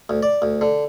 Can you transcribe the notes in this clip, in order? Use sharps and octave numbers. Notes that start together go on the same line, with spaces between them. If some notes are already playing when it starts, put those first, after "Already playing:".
D2
D5
D2
D3